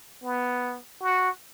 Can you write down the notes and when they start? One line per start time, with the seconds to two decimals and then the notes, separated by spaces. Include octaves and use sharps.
0.23 B3
1.02 F#4